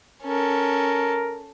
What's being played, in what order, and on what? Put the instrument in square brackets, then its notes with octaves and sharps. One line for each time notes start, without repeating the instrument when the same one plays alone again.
[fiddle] C#4 A4 [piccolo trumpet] A#4